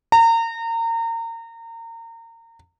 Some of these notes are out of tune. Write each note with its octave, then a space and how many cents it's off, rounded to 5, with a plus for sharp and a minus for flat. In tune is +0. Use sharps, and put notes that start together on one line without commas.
A#5 -30